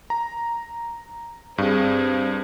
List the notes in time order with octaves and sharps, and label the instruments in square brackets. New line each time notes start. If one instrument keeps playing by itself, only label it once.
[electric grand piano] A#5
[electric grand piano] G2 [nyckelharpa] C4 G#4